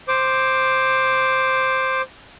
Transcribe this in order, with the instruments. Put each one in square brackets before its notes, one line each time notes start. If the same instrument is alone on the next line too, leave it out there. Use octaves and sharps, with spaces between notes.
[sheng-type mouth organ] C5 D6